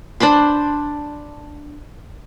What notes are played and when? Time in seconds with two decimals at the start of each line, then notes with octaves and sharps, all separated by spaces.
0.20 D4 C5 B5 C6